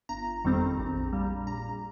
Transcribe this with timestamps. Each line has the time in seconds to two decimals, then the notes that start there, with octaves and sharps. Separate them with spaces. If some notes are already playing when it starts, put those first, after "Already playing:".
0.09 G1 A#5
0.44 F2 D#3 G3 C4
0.78 A#1
1.13 A#2 G3
1.47 A#1 A#5